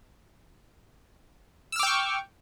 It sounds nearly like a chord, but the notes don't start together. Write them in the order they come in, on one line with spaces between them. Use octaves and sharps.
E6 F6 D6 G5 C#6